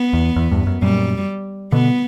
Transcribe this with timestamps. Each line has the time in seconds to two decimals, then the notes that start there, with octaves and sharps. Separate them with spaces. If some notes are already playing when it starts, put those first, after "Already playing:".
Already playing: B3
0.13 E2
0.36 E2
0.51 E2 G2
0.67 F#2
0.82 F#2 A#2 G3
1.72 B2 D3 B3